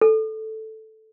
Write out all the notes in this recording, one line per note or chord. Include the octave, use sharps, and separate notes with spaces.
A4